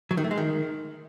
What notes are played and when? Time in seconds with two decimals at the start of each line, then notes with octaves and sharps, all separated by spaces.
0.11 F#3
0.17 D#3
0.24 A3
0.31 G#3
0.38 D#3